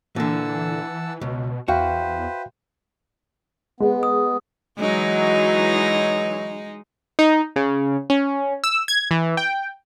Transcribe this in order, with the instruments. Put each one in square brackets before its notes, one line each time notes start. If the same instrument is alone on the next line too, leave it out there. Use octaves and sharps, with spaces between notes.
[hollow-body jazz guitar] A#2 D3 [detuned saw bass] E3 [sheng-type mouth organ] F#5 A5 E6
[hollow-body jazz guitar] C#2 [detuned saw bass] B2
[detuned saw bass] E2 [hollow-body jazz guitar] F#4 [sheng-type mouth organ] B4 C5 [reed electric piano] E5 F5 G5
[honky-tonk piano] G#3 [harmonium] B3
[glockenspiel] D#6
[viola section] E3 F#3 [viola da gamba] G#3 D#4
[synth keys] D#4
C#3
C#4
E6
G#6
E3
G5